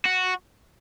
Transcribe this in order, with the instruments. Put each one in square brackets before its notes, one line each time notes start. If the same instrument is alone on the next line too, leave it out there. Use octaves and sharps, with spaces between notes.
[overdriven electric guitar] F#4